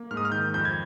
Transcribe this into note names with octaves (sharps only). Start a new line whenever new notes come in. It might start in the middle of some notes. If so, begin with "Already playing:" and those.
Already playing: A#3
G#2 F6
D#6
F6
D#3 G6
F2 G6
G#6